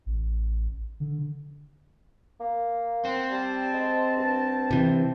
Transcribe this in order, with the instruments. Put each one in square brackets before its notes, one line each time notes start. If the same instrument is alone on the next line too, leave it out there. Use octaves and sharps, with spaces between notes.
[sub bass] A1
D3
[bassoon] A#3
[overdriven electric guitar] C4 [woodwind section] F#5 C6
[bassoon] G3 [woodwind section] A5
[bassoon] G#3
G2
[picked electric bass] C3 E3